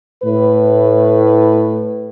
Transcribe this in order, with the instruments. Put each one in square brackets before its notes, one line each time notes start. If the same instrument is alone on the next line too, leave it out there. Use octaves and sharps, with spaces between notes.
[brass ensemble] A2 B4